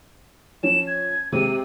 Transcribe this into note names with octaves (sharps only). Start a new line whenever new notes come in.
F3 C#4 E7
G#6
C3 G#3 C4 D#7